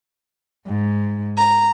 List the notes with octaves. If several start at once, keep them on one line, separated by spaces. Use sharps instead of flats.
G#2
A#5